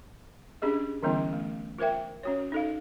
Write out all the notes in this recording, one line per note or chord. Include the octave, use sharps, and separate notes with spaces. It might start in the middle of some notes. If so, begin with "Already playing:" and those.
C#4 D4 G4 G#4 D#5
D3 E3 G3 B3 C#4 E4
A3
F4 A#4 C5 E5 G5
C#4 F#4 C#5
D#4 A4 F5